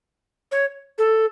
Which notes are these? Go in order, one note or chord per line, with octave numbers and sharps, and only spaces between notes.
C#5
A4